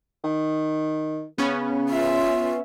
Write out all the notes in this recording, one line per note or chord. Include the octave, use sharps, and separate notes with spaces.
D#3
C#3 B3 C#4
F4 E5